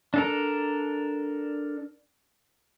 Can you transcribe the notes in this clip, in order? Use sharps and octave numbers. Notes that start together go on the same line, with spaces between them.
D4 A4 A#4